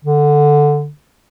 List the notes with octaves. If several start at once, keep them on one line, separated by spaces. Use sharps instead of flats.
D3